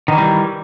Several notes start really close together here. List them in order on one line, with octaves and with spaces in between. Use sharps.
D#3 E3 G3